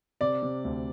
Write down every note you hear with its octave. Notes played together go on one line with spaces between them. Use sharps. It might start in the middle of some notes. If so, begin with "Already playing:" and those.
C3 D5
C3
D2